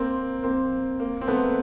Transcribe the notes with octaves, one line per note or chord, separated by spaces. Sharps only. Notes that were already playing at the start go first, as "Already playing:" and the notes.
Already playing: A#3 C4
A#3 C4
A#3
C4
A3 B3